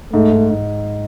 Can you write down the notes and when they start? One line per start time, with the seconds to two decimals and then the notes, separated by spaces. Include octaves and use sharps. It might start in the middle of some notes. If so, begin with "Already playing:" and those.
0.13 G#2 A3
0.32 G#2
0.50 G#2